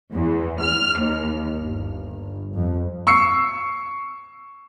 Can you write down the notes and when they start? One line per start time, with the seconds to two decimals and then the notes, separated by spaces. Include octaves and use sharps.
0.13 E2
0.60 F6
0.99 D#2
1.57 G1
2.55 F2
3.07 C#6 E6 C7 C#7